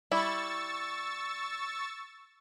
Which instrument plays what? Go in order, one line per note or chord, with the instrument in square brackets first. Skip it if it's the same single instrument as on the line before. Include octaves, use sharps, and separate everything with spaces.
[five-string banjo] G3 E4 [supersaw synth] C#6 E6 A6